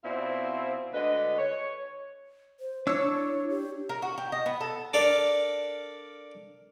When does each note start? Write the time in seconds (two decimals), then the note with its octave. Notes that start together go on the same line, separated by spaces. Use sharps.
0.04 B2 C4 E4 F4 C5 D5
0.94 D2 D3 G#3 B4 D#5
1.38 C#5
2.60 C5
2.87 D4 E4 C#5 E6
3.50 G4
3.89 A#4
4.02 F#4
4.18 G4
4.32 D#5
4.46 B3
4.61 A4
4.94 D4 A4 A#4 D5 F5